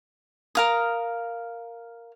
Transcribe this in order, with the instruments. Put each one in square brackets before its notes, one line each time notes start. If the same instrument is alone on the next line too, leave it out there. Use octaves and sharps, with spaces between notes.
[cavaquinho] A#4 F5 D#6